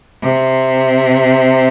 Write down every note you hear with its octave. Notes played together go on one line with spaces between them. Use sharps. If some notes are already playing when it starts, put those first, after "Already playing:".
C3